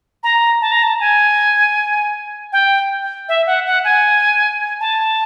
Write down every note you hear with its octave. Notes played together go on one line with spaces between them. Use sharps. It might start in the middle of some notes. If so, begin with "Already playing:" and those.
A#5
A5
A#5
A5
G#5
G5
E5
F#5
F#5
G#5
A5